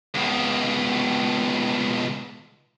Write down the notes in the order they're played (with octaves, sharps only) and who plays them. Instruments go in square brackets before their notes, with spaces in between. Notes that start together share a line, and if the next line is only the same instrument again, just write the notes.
[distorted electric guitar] C#2 B2